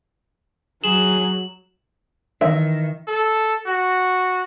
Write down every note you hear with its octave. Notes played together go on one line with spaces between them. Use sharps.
F#3 G#4 E7 F#7
D#3 E3 E5
A4
F#4